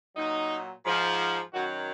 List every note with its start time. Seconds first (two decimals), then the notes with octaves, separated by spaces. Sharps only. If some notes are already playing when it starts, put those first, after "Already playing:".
0.15 A#2 F#3 D#4
0.85 G#2 F3
1.52 F#2 D#3 F#3 F#4